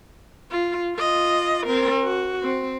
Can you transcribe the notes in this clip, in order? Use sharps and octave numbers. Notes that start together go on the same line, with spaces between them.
F4
F4 D#5
C4 A#4
F#4
C4